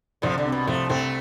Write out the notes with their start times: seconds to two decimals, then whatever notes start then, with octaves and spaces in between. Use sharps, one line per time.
0.22 C2 D3 F3
0.38 D3
0.45 C3
0.52 B2
0.67 C2 F3 A3
0.89 C2 A3 C4